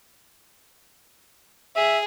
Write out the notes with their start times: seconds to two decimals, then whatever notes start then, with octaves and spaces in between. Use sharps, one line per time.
1.76 G#4 E5